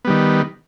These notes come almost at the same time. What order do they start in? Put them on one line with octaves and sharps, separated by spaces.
B3 G3 D#3